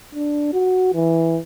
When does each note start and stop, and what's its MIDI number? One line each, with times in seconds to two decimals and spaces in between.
0.15 0.49 62
0.53 0.91 66
0.94 1.39 52